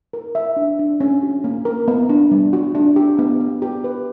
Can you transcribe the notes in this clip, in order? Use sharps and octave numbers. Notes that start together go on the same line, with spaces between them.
A#4
E5
D4
D4
C#4
F#4
A#3
A#4
B3
D4
G3
F#4
D4
G4
B3
B3
G4
B4